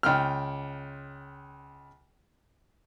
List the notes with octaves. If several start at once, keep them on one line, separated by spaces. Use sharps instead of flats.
C#2 G5 F6